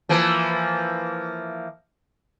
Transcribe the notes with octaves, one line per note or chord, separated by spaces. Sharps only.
E3 F3 A#3